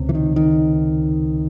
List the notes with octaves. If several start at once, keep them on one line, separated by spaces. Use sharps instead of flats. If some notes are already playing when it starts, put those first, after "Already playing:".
Already playing: C#2 C3
E3
D#3
D#3